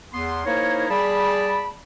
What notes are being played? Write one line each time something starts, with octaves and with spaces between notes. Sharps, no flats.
E2 B3 C6
A#3 D#4 E4 A#4 C5 C#5
G3 G#4 D5 A5 B5